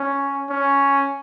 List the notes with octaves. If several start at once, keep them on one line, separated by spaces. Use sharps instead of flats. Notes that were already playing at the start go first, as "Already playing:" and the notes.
Already playing: C#4
C#4